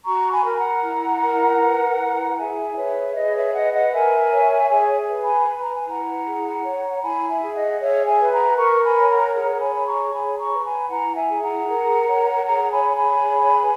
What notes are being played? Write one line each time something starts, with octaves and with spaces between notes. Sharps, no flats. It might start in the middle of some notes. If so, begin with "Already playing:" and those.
F#4 A#5 C#6
G#5 B5
A#4
G#5
F#5 A#5
E4
A#4
B4
E4
F#5
G#4 E5 G#5
B4 C#5 E5
G#4 D#5
C#5 E5
B4 D#5 F#5
D#5 F#5
A#4 E5 G#5
C#5
G#4 E5 G#5
B4
G#5 B5
B4 B5
A#5
G#5
E4 F#5 A#5
G#4
C#5
E4 G#5 B5
E5 G#5
G#4
D#5 F#5
G#4 C#5 E5
E5 G#5
B4
F#5 A#5
A#4 A#5 C#6
G#5 B5
C#5
F#5 A#5
G#4 F#5 A#5
G#5 B5
C#5
A#5 C#6
G#4 G#5 B5
A#5 C#6
B4
G#5 B5
E4 F#5 A#5
E5 G#5
G#4
F#5 A#5
A#4
C#5
G#4 F#5 A#5
G#5 B5
C#5
G#5 B5
G#4
B4